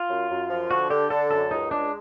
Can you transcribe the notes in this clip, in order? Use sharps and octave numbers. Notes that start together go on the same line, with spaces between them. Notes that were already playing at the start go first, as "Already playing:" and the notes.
Already playing: F4
F#2
F#2
F3
D3 F#4
D3 G4
D3 A4
F#2 A4
C#2 D#4
G#3 D4